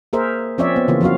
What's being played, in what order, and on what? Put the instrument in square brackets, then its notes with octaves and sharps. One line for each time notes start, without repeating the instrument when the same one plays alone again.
[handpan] A#3 G#4 A#4 C5 E5
F3 C4 C#4 C#5 D5 E5
B3
C#3 E3 A#3 F4
F3 F#3 C4 F#4 F5